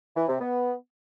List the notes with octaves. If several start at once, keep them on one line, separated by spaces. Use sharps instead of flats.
E3
C3
B3